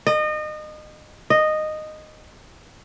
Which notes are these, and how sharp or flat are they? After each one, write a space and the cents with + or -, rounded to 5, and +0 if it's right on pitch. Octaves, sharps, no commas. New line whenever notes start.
D#5 -30
D#5 -10